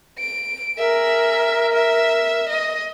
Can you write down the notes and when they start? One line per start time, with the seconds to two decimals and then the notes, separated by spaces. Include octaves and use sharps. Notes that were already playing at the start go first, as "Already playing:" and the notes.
0.19 D7
0.78 G#4 A#4 E5
1.73 E5
2.49 D#5